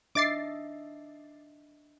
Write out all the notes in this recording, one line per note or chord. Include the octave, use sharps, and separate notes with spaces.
D4 D#5 E5 D6 A6 C7